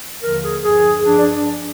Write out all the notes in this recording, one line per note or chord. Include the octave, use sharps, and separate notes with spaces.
D#2 D3 F3 A#4
G#4
G2 F3 G#4
G2 F3 D4
D5